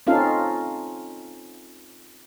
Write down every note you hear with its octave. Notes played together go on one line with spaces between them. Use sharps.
C4 C#4 D#4 F4 A4 F5